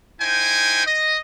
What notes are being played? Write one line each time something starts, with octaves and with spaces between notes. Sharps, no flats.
D#4 E4 C5 G5 G#5
D#5